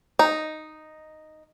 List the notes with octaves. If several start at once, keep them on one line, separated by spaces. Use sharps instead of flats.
D#4